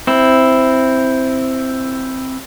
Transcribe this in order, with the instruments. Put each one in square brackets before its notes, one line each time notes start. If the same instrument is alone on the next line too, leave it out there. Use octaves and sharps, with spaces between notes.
[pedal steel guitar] C4 E4